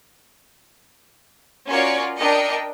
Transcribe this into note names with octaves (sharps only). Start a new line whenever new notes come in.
C#4 F4 F#4 A#4 C#5 D5
D4 A#4 D#5 G5 C#7